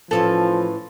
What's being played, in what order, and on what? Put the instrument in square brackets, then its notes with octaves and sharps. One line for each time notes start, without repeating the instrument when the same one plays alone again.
[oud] A2 E3 C#4 [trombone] F3 [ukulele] A4